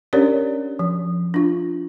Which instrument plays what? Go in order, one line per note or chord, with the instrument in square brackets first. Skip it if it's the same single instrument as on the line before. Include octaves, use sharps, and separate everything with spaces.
[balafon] C#4 D4 G4 A#4 C#5 D5
F3
D4 F4